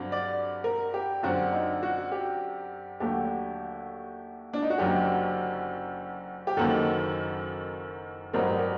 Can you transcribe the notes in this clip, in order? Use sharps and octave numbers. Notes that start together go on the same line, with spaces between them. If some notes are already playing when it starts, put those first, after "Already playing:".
Already playing: G2 D3 F#3 C4
D5
A#4
G4
F#2 D3 F#3 C4 F#4
D#4
F#4
G4
D#2 D3 F#3 A3 G4
D4
D#4
F#4
F#1 F#2 D3 F#3 G4
G4
F#1 F#2 D#3 F#3 A#3 A4
A1 G2 F#3 C4 A#4
A#4